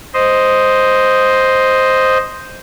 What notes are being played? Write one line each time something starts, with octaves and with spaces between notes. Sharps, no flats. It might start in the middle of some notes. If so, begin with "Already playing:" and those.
C5 D#5